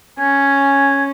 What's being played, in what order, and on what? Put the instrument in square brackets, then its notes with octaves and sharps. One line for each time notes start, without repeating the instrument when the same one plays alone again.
[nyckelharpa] C#4 [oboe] G#5